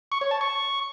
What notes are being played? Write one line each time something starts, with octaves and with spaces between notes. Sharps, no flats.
C#6
C#5
A5
C#6